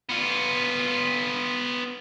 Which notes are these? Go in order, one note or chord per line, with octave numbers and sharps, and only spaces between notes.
B3 F4